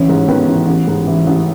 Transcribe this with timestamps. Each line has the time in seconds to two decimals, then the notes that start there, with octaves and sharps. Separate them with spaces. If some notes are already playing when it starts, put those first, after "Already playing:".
Already playing: A1 E3 C#4
0.09 G#2
0.28 D#3 B3
0.47 A1
0.67 A1
0.87 G#2
1.07 E3
1.27 A1